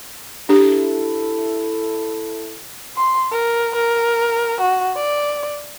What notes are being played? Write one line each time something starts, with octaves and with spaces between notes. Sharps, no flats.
D4 E4 G4 A4
C6
A#4
A#4
F#4
D5